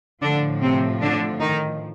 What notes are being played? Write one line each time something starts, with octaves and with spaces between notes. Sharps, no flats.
A2 D3 F3 D4
C3 C4
D3 D4
D#3 D#4